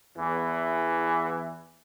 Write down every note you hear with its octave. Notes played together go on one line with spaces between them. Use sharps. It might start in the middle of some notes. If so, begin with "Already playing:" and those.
E2 E3